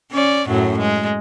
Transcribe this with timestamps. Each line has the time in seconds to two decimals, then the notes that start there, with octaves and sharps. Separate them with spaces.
0.12 C#4 D5
0.48 F#2 A2 F#3
0.79 G#3